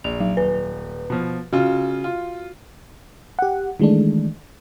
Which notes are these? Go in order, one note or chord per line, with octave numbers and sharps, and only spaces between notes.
A#1 F7
F#3
D#1 B4
B2 F3
C#3 F4 F#4
F4
G4 F#5
D#3 E3 G#3 A3 D4